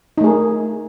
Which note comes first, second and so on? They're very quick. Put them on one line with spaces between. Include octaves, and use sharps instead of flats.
D#4 A3 G#4 A#4